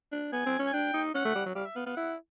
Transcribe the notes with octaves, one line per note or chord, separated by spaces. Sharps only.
D4
B3 G#5
C4
C#4
G#5
D4 G5
D#4
C#4 F#5
A3
G3
F#3
G3 F5
E5
B3 F5
B3 F5
E4 F#5